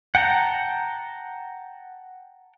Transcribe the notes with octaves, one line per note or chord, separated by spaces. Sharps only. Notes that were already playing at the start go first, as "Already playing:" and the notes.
F#5 G5 A5 A#5